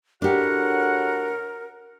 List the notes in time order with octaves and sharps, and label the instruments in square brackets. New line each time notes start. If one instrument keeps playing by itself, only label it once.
[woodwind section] A2 F#4 F#5 [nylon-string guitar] D4 G4 [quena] A#4